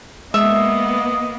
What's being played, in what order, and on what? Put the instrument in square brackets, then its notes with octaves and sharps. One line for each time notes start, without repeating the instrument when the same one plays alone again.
[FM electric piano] G#3 [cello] A#3 B3 [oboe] D#5 [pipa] E5